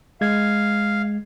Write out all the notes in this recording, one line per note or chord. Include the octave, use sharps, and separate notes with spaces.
G#3 F5 G#6